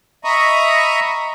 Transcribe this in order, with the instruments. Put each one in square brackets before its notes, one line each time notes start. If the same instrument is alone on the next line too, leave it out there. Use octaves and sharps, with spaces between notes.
[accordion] D#5 E5 A#5 B5 C#6 D#6